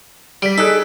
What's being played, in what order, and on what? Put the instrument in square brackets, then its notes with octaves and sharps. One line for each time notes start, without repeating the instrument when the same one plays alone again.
[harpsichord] G3 [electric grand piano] B6 D7
[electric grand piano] D#4 G#4 F#6 [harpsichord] A4